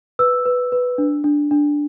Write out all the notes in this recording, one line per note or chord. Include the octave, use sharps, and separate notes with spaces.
B4 E6
B4
B4
D4
D4
D4